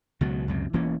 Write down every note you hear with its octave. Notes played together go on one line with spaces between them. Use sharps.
C#2 B2 F#3
C#2 F#2 C3
E1 E3 A#3 C#4